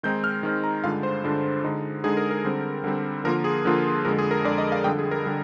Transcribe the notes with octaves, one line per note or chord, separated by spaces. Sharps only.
D#3 G#3 C4 D#4 G6
F6
D#3 G#3 C4 D#4
A#5
G2 D3 G#3 D4 F4 F5
C5
G2 D3 G#3 D4 F4
D3 G#3 D#4
D3 G#3 D#4 G#4
A#4
A#4
D3 G3 C4
D3 G3 C4
D3 F3 A#3 F4 A#4
G#4
D3 F3 A#3 F4
F2 D3 G#3 A#4
G#4
A#4
F2 D3 G#3 D5
D#5
F5
F2 D3 G3 G5
G#4
A#4
D3 G3